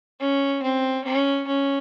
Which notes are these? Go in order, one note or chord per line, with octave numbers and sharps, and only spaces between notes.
C#4
C4
C#4
C#4